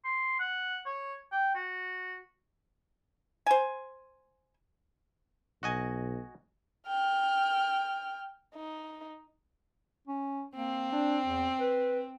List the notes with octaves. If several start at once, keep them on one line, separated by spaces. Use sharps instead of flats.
C6
F#5
C#5
G5
F#4
C5 G#5
B1 F#4 D#5 G#5
G5 F6
D#4
C#4
A#3 C4
D4
E2
B4